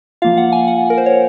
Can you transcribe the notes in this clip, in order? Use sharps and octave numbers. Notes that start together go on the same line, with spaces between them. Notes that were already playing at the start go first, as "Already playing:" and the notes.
F3 A#3 F4 F5
F#5
G#5
F#5
A#4
C5
C#5